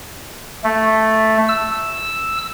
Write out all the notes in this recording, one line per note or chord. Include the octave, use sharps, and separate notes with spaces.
A3
E6